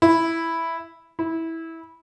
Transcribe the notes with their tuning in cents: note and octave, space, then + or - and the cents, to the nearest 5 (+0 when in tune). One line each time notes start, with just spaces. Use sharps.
E4 +0
E4 -15